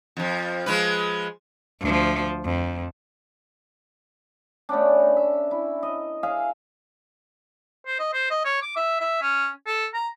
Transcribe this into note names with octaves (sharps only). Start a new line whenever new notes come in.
F2 F3
F3 G#3 B4
D2 F3
F2
A3 B3 C#4 D4
A#4
E5
E4
D#5
G#4 E5 F5
C5
D#5
C5
D#5
C#5
D6
E5
E5
C#4
A4
A#5